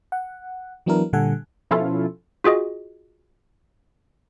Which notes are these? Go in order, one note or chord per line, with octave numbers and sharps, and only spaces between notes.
F#5
E3 F#3 B3 D4 E4 A#4
A#2 D3 G3 A4 F#5 G#5
B2 F3 C#4 E4 F4 A4
F4 F#4 G#4 D#5